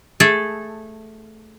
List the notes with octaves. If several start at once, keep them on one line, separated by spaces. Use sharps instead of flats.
A3 G#4 A4